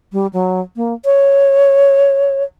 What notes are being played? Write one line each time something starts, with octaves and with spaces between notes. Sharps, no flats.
G3
F#3
A#3
C#5